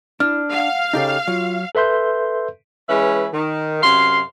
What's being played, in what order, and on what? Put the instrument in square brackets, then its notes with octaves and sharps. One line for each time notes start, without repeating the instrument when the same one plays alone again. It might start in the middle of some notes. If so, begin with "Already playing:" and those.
[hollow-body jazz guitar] D4 [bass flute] E4 [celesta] F6
[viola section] F5 [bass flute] F#5
[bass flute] C#3 [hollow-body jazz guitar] D#4 G4 A4
[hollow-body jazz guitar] F#3 [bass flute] F4
[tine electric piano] A4 B4 E5 C6 G6
[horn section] E3 G#3 C#4 B4 E5
D#3
F#2 C3 F5 C6